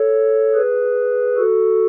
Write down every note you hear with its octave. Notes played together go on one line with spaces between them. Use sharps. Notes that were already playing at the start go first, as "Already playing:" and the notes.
Already playing: A4 C#5
G#4 B4
F#4 A4